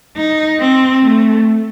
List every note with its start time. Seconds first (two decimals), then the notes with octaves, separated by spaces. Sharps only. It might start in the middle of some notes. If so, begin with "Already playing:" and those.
0.17 D#4
0.60 C4
1.03 A3